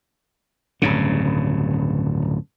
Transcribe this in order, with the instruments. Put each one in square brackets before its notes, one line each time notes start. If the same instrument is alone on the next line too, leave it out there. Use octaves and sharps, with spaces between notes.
[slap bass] D1 G2 C#3